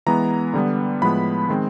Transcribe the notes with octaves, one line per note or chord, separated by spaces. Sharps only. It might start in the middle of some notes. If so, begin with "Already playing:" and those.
E3 G#3 B3 A#5
D3 G3 B3
A2 F3 G#3 B3 B5
D#3 G#3 C4